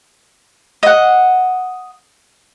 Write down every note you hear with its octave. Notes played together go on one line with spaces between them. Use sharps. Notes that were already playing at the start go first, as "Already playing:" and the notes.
D#5 F#5